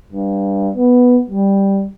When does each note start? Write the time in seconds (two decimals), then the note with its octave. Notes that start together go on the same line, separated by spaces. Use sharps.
0.13 G2
0.75 B3
1.30 G3